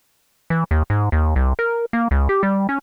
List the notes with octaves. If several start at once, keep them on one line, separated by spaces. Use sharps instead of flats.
E3
D#2
G#2
D#2
C2
A#4
A#3
C#2
G4
G3
C#4